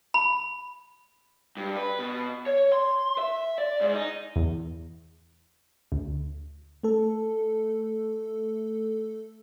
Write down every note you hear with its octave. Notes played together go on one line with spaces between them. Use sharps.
B5
G2
B4
B2
C#5
C6
E5
D5
G#2
D#4
E2
D2
A3 A4